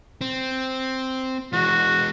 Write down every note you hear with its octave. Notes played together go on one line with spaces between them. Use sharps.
C4
E3 G#3 F#4